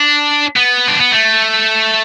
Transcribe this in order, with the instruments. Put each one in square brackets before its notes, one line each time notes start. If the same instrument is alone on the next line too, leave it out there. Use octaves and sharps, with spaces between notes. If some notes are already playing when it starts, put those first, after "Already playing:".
Already playing: [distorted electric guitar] D4
B3
D4
B3
A3